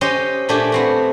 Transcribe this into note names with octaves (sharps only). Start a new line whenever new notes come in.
C#4 G4 C5 D#5
A#2 A3 D4 G4 G#5
B3 C4 F#4